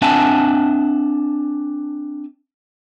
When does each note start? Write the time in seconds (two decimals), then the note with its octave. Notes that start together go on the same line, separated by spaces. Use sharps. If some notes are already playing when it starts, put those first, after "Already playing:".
0.02 C4 D4 E5 F#5 G#5 A5